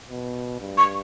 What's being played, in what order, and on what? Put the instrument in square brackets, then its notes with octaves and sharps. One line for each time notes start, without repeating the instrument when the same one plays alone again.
[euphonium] B2
G2
[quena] C#6